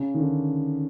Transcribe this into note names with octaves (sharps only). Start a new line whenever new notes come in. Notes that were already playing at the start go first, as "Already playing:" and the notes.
Already playing: C#3
D#3
D3